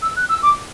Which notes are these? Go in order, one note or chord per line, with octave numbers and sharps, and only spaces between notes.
E6
F#6
E6
D6